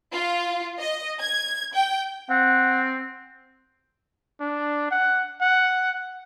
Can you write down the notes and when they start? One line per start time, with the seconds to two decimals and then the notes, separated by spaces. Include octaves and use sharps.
0.13 F4
0.80 D#5
1.20 G#6
1.74 G5
2.30 C4 F#5
4.41 D4
4.91 F#5
5.42 F#5